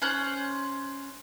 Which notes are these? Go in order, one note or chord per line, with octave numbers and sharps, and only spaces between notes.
C#4 C5 F#6 G6